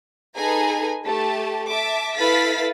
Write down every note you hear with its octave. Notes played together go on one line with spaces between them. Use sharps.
D#4 G#4 A4 B4 G#5 A#5
A3 G4 A5
E5 A5 D6
E4 A4 B4 F5 A6 B6